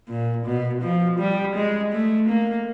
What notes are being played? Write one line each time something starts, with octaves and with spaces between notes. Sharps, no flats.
A#2
B2
F3
G3
G#3
A3
A#3